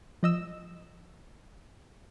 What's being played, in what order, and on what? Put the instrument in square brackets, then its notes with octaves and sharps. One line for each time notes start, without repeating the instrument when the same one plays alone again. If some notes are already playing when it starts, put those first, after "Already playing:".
[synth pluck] F3 D#5 E6